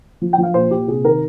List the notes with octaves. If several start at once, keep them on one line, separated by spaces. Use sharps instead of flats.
F3
G5
F3
F5
A#2 C5
A#2 G4
C3 G#4
D#3 A#4